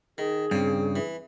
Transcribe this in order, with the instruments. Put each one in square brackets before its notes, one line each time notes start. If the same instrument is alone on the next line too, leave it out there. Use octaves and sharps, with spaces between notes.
[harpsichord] D#3 [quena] G#4
[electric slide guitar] G2 C#3 [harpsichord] C4
[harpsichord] E3